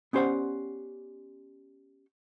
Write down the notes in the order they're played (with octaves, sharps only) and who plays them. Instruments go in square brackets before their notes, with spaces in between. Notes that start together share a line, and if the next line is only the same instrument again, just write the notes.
[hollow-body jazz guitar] B3 C#4 G4 C5 D5 F#5